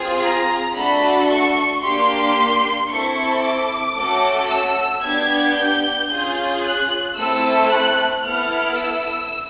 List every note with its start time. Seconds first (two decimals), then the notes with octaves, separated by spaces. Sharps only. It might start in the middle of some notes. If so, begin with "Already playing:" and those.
Already playing: C4 F4 G#4
0.22 A#5
0.75 A3 D4 F#4 A4 B5
1.29 C#6
1.82 A#3 D4 G4 C6
2.90 C4 E4 A4 C#6
3.43 D6
3.96 A3 C#4 F#4 A4
4.49 E6
5.03 B3 D4 G4 G#6
5.56 G6
6.10 C#4 F4 G#4
6.64 F#6
7.17 A3 C4 E4 A4 E6
7.70 F#6
8.24 B3 E4 A4 F6
8.77 E6